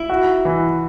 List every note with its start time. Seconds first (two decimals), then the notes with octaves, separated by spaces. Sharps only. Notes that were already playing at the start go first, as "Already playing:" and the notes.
Already playing: E4
0.10 F#4
0.45 E3